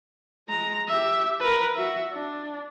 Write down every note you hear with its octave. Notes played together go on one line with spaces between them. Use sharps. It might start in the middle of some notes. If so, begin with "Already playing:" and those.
G#3 A#5
G4 E5
A#4 B4
F#4 E5
D4